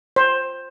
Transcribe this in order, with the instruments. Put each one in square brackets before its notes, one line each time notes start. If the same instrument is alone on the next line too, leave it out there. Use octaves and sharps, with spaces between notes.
[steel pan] C5